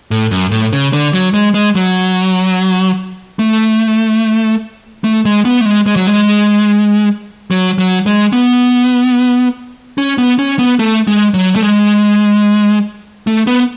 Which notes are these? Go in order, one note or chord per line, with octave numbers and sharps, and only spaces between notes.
A2
F#2
A2
C#3
D3
F#3
G#3
G#3
F#3
A3
A3
G#3
B3
A3
G#3
G#3
F#3
G#3
F#3
F#3
G#3
B3
C#4
B3
C#4
B3
A3
G#3
F#3
A3
G#3
A3
B3